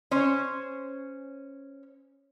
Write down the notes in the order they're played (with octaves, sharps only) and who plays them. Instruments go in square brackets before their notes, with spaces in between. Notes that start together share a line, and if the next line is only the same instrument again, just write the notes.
[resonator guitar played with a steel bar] C#4 C5 C#5